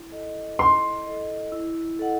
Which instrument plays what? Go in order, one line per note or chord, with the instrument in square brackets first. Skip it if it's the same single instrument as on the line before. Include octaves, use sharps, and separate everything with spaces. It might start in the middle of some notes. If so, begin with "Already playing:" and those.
Already playing: [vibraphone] E4
A4 D#5
[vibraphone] E4 [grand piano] C6
[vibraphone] A4 D#5
E4
A4 D#5 F#5